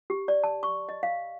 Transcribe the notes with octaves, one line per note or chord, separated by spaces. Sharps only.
G4
D5
A5
C#6
D#5
F5